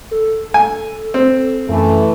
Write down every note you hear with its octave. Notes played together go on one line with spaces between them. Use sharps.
A4
G#5
C4
F#2 E3 A3